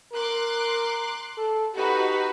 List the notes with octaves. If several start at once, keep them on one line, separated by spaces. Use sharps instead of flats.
A#4 C6 D6 F#6
A4
D#4 F#4 G4 B4